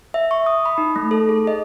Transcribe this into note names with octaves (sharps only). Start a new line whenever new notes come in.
E5
C#6
D#6
B5
D#4
A3
A4
G#4
D#5